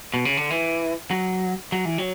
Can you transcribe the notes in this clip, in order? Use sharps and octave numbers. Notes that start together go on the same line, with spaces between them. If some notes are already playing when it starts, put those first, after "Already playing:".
B2
C#3
D3
E3
F#3
F#3
E3
F#3